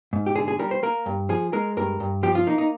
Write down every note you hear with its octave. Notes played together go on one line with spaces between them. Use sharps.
G#2
G4
D3 G#4
G#4
G3 A#4
C5
A#3 A#4
G2
F3 G#4
G#3 A#4
G2 A#4
G2
F3 G4
F4
A#3 D#4
D#4